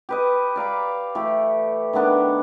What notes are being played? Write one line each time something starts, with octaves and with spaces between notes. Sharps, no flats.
G4 B4 D#5
D5 F5 A#5 B5
E3 A3 G4
D#3 A3 B3 D4